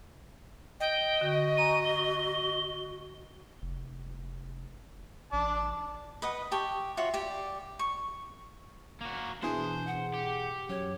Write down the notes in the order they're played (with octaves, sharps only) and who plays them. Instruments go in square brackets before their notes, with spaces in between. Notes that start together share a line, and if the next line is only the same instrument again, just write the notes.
[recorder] D#5 [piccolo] G5
[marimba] D3 [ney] F#4
[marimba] G#5 A#5 C#6 [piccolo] D#7
[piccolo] G7
[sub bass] F1
[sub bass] A1 [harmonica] D5 A5
[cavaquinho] B4 D#5 F#5
G4 G5 A5 C#6
F4 F#4 C#5 E5
G4 D5
C#6
[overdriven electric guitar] A#3 F#4
[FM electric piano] B2 E3 G#4 [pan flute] D4 [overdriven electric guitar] C5
[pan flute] F#5
[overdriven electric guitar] G4
[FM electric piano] F#2 [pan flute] C#5